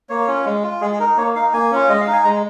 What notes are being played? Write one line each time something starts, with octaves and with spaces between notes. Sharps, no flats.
A#3 C#5
C#4 F4
G#3
F4
G#3 G#4
G#4
D#4 A#4
A#3 C#5
D#4 F5
A#3 G#5
C#4 F4
G#3 D#5
F5
D#4 G#5
G#3 A#5